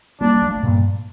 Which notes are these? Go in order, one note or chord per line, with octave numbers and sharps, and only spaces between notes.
G3 A#3 D4
F3 A3
G2 A#2